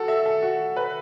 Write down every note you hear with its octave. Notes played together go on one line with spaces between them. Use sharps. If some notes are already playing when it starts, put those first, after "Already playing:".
Already playing: F#4 A4
E5
A4
F#4
B4